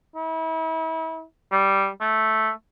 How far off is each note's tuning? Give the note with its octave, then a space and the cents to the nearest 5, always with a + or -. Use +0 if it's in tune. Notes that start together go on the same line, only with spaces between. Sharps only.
E4 -35
G3 -5
A3 -5